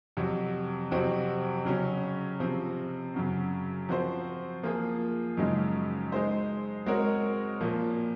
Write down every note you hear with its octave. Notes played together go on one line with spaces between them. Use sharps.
F2 C3 F#3
F2 C3 F#3 C4 F#4
C#3 F#3 C#4
C3 F3 C4
F#2 C#3 F#3
F3 C4 F#4 C5
F3 A#3 F4 G#4
F#2 C#3 F3 G#3 D#4
G#3 D#4 G#4 C5
G#3 C4 F#4 A#4 C#5
A#2 F3 A#3